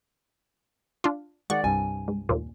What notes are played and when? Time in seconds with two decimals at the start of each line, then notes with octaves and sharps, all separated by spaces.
1.04 D4 F4
1.50 D#3 G#3 D5 F#5 C#6
1.64 C2 G2 G#5
2.08 G#2
2.29 D#2 A#2